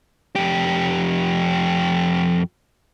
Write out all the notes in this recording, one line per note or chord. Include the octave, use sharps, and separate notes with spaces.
F2 G4